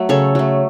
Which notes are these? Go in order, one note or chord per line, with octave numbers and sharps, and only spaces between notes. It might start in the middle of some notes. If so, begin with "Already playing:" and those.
Already playing: F#3 A3
C#3 A4 C#5
F#3 A3